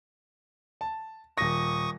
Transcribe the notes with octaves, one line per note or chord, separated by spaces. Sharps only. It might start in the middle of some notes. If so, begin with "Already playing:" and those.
A5
D#1 C#6 D#6 A#6